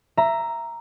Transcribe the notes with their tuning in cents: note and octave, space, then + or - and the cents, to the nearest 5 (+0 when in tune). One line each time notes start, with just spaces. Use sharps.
E5 +15 A#5 +0